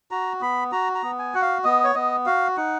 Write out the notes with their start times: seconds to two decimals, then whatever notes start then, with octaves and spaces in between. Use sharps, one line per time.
0.11 F#4 A#5
0.41 B3 B5
0.72 F#4 A#5
0.95 A#5
1.03 B3
1.19 G#5
1.34 F#4 F#5
1.42 F5
1.64 B3 D#5
1.84 C#5
1.95 B3 D#5
2.26 F#4 F5
2.57 D#4 F#5